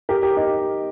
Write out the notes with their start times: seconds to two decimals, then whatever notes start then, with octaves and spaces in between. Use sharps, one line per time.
0.09 G4 A#4
0.23 G4 A#4
0.37 D#4 G4